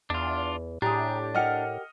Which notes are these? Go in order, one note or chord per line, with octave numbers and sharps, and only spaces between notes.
E2 D4 F4
A2 D4 G4 G#4 A#5
G4 A#4 D#5 F#5 F6 C#7